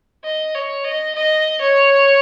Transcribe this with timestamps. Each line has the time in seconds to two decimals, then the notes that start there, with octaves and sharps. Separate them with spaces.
0.24 D#5
0.55 C#5
0.85 D#5
1.15 D#5
1.61 C#5